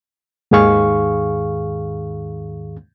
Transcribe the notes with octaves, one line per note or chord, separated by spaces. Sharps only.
D#2 G#2 D#3 G#4 F5 C#6